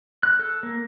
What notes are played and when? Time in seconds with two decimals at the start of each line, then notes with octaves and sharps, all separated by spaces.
0.23 F#6
0.39 A4
0.63 A#3